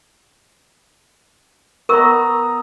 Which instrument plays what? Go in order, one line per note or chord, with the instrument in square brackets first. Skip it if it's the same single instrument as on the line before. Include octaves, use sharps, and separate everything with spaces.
[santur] B3 D#5 A#5 [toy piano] A#4 C#6 E6